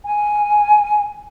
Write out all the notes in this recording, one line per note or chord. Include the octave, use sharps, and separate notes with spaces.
G#5